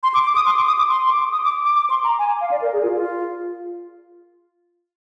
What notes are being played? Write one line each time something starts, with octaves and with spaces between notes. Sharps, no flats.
C6
D6
D6
D#6
C6
D6
D#6
D6
C6
C6
D6
D#6
D6
D6
D6
C6
A#5
G#5
F5
D5
A#4
G#4
F4
F4